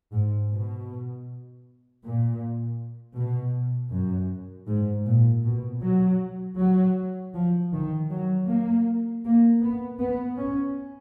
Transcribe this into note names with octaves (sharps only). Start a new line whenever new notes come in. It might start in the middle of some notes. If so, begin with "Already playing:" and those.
G#2
B2
A#2
B2
F#2
G#2
A#2
B2
F#3
F#3
F3
D#3
F#3
A#3
A#3
B3
B3
C#4